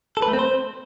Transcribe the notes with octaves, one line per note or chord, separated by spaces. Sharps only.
A4
B4
A3
C4
C5